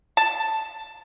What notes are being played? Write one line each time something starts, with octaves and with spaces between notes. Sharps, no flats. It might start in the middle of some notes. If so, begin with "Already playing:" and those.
A5